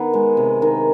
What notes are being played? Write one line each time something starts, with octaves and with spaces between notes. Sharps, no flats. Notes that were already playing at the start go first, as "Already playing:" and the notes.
Already playing: D#3 B3
G#3
C3
D#3